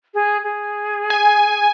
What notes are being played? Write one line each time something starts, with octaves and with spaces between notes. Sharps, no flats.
G#4
G#4
G#5